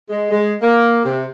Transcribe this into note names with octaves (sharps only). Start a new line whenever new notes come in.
G#3
G#3
A#3
C3